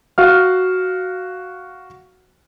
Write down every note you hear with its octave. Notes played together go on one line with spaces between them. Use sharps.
F#4 F5 F6